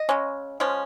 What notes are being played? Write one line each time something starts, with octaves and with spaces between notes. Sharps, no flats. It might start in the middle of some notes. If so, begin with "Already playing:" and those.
Already playing: D#5
C#3 G#3 C#4
F3 G#3 C#4